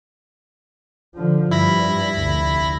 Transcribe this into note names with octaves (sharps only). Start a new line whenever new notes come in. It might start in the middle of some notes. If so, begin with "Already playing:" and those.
D3 F3
G2 E4 B5 A#6
F1 D2